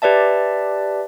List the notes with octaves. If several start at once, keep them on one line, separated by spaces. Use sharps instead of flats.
G4 B4 D5 E5 A5